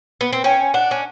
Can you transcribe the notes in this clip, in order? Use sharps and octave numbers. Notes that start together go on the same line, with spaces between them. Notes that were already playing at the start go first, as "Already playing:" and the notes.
B3
C4
C#4 G5
D4 F#5
C#4